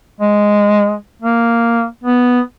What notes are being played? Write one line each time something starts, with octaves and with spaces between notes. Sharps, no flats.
G#3
A#3
B3